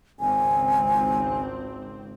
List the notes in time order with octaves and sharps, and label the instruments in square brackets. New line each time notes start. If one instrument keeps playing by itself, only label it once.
[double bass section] G#1 C#2 C4 [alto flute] G#5